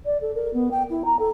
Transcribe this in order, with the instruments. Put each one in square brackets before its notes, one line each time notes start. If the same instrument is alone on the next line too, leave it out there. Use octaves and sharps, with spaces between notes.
[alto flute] D5
A4
A#4
B3
G5
E4
A#5
A4